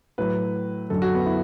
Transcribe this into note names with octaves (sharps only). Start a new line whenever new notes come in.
A2 F#3 B4
F#2 D3 F#3 A4
F#4
B3
E4